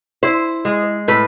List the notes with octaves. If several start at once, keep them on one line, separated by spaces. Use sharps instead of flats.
E4 C5
G#3
A2 B4